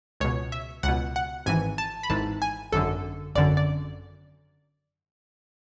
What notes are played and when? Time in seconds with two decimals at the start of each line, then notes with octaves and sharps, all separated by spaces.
0.20 C#2 B2 C#5
0.52 E5
0.83 C#2 B2 F#5
1.16 F#5
1.46 G#1 G#2 E3 G#5
1.78 A5
2.03 B5
2.10 G#1 G#2 E3 A5
2.42 G#5
2.72 G#1 F#2 D3 A4
3.35 G#1 F#2 D3 D5
3.57 D5